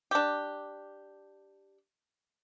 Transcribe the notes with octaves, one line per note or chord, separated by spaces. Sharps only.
D4 G4